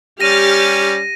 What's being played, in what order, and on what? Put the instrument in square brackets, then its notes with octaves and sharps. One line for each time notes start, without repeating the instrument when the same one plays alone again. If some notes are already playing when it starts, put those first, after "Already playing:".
[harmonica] G3 C#4 [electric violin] G4 [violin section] F6 A6 [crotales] A#6 D#7